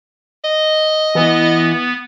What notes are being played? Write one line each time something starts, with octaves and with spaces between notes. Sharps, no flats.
D#5
E3 B3